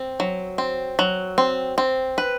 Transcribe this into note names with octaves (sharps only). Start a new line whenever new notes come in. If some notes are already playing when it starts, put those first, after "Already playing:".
Already playing: C4
F#3
C4
F#3
C4
C4
B4